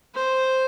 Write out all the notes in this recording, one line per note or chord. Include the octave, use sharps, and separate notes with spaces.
C5